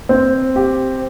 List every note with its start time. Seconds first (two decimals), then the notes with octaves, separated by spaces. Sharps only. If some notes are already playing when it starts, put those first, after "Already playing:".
0.09 C4
0.56 G4